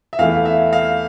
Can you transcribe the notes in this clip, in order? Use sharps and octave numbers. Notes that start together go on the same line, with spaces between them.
E5
E2 E3 A3 E4 F5
E5
F5